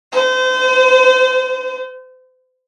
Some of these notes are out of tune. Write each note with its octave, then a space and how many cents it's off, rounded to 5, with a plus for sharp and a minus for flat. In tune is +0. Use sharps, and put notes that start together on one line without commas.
C5 -35